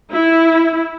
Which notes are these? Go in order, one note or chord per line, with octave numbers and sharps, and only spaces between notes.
E4